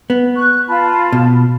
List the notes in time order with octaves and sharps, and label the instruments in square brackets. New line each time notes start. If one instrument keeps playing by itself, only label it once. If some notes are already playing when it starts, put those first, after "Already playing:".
[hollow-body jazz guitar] B3
[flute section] C#6 F#6
F4 A5 B5
[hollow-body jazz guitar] B2